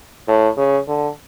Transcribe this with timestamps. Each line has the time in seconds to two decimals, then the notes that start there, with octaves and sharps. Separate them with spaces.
0.28 A2
0.57 C#3
0.88 D3